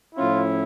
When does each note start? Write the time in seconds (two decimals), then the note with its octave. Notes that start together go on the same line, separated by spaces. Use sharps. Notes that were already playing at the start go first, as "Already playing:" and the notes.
0.16 A2 F3 C#4 E4 F4